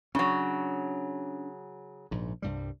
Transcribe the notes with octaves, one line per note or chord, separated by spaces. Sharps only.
C#3 F#3 C#4 D4
A#1 G#2
C2 G2 G3